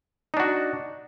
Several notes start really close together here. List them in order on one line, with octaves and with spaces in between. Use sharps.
D#4 D4 F#4